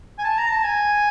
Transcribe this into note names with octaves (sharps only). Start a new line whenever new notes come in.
G#5
A5
A#5
A5
G#5